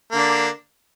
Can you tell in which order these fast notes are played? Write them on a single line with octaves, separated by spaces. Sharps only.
A#3 D3 D4